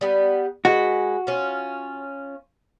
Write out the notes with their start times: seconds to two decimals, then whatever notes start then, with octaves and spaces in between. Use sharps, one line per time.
0.01 G3 B3
0.65 G#3 F#4 B4
1.27 C#4 F4